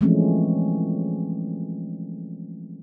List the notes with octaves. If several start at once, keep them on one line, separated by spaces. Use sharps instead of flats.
E3 F3 G#3 A3 C4 C#4